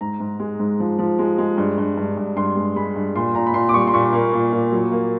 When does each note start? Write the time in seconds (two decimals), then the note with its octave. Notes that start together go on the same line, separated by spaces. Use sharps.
0.01 G#2 A#5
0.20 G#2
0.40 G#3
0.60 G#2
0.80 F3
0.99 F3
1.19 G#3
1.38 G#3
1.58 G2
1.78 G2
1.97 G2
2.17 G2
2.37 G2 C6
2.56 G#3
2.76 G#3 B5
2.96 G2
3.15 A#2 C6
3.35 A#2 A#5
3.47 B5
3.54 A#2 C6
3.69 D6
3.74 G3 C#6
3.87 C6
3.94 A#2 C#6
4.13 A#3
4.33 A#2
4.53 A#2
4.72 F#3
4.91 A#3